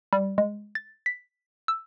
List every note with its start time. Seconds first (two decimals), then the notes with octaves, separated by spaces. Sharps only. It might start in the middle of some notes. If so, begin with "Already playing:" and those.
0.13 G3
0.38 G#3
0.75 A6
1.06 B6
1.68 E6